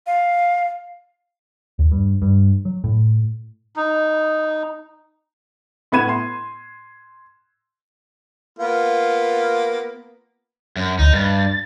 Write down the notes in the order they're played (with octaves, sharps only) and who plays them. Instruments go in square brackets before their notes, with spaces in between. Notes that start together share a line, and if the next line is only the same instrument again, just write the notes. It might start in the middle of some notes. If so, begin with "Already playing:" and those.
[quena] F5
[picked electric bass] D#2
G2
G2
F#3
A2
[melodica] D#4
[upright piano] A2 B3 B5 G#6 D#7 E7
C6
[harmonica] A#3 B3 F4
[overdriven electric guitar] F#2
[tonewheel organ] D2 [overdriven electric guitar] D#4
[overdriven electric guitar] G2 [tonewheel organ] A6